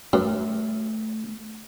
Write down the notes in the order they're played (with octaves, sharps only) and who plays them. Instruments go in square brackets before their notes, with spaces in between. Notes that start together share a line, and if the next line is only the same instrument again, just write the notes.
[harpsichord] F#2 [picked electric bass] A3